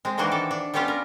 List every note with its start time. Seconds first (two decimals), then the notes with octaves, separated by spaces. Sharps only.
0.05 G#3 C4
0.18 D#3 E3 A#3 D4 F#4 C5
0.32 A4
0.51 D4
0.74 G3 B3 C#4 F4 G4 F5
0.88 A#4